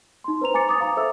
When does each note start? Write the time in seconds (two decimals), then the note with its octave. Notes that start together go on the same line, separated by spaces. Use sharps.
0.24 D#4 C6
0.41 B4 C5 A#5 F7
0.54 G#5 A#5 D6 A6 C#7
0.69 D6 D#6 A6
0.80 F5 A#5
0.97 A4 C5 E5 E6